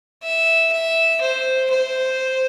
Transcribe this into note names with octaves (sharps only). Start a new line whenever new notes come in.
E5
E5
C5
C5